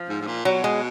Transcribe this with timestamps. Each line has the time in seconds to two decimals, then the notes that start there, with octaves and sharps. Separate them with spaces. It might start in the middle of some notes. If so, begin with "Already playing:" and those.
Already playing: F3
0.09 G#2
0.21 G#2
0.27 A#2
0.45 B2 F#3
0.64 G#3